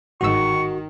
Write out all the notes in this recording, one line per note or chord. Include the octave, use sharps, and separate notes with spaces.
G1 G#2 D#3 F#4 C#6 E6